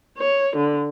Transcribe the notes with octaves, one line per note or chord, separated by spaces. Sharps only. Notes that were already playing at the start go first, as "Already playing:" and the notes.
C#5
D3